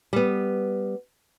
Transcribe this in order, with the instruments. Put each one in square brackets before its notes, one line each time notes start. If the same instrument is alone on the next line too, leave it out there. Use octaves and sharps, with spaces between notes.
[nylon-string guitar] G3 B3